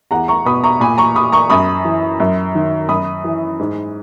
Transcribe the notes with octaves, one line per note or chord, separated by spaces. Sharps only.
E2 F#5 A#5
A#5 C#6
B2 B5 D#6
A#5 C#6
A#2 G#5 B5
A#5 C#6
B5 D#6
A#5 C#6
F#2 B5 D#6
E3
F#2
D#3
F#2 B5 D#6
E3
G#2